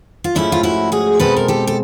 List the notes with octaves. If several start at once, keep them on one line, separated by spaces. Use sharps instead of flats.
F4
G#2 F3 A3 C#4 D4 E4
F4
E4 F#4
F#4 G#4
B2 G#3 C4 A4 B4
A#4
G4 A4
A4